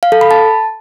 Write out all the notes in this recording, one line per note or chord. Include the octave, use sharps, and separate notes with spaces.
F5
A4
B5
A5